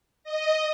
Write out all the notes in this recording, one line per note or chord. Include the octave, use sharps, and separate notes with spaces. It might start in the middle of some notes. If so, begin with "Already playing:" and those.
D#5